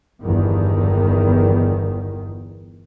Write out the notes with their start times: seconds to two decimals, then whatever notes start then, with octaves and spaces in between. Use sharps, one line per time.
0.22 G1 E2 D#3